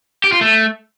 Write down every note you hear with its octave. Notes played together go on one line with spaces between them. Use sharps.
G4
F4
A3